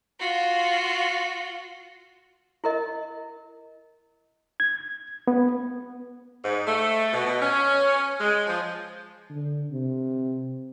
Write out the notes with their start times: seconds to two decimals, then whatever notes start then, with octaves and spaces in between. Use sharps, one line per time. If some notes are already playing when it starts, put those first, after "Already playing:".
0.20 F4 F#4
2.64 E4 A#4 D#5
4.60 G#6
5.28 B3
6.43 G#2
6.67 A3
7.13 B2
7.26 B2
7.40 C#4
8.20 G#3
8.47 F3
9.30 D3
9.71 C3